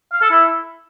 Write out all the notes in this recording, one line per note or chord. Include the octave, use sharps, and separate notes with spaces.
F5
A4
E4